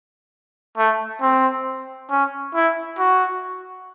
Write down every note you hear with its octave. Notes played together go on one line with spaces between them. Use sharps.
A3
C4
C#4
E4
F#4